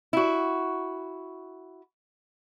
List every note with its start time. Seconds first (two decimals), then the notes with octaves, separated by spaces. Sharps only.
0.13 E4 F#4